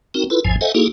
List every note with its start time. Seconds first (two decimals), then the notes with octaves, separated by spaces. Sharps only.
0.14 C4 D#4 F#4 A#4
0.30 E4 F4 A4 B4
0.45 A1 E2 G#2 F3 G#5
0.61 A4 C5 D#5 E5 F#5 G#5
0.75 A#3 D#4 E4 F#4 G#4 A4